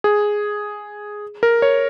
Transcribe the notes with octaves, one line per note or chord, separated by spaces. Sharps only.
G#4
A#4
C#5